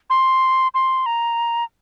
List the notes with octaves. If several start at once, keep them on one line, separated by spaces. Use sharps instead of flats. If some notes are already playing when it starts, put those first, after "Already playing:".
C6
C6
A#5